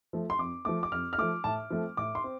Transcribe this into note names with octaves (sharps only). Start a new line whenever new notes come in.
F3 A3
C6
F2 D6
F3 A3 D6
D6
F2 F6
F6
F3 A3 D6
A2 A5
F3 A3 C4
A2 D6
C6
C4